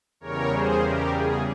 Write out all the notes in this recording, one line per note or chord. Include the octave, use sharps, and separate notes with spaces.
E2 C#3 G3 A#4 C#5
G#4 C5
G4 A#4
G#4